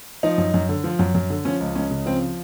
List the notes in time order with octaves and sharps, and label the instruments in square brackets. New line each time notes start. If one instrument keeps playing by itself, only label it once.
[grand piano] F3 D#4
F#2
F#2
D3
F3
F#2
F#2
D3
F3 C#4
C#2
C#2 C#4
C#3
F3 C4